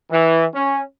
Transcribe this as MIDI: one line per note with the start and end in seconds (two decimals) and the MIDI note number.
0.11 0.45 52
0.54 0.82 61